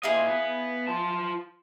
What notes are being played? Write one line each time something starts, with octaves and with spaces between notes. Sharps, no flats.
A#2 E4 G#4 D#5 F5
B3
F4 A5